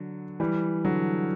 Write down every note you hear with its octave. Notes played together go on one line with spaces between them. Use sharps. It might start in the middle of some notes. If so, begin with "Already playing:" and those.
Already playing: D3 F#3
E3 G3
D3 F#3